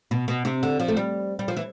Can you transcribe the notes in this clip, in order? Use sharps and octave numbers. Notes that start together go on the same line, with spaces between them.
B2
B2
C3
D3
F3
A3
G3
G3
F3
E3